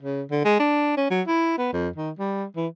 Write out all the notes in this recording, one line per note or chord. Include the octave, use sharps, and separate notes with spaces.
C#3
D3
G#3
D4
C#4
F#3
E4
B3
F2
D#3
G3
E3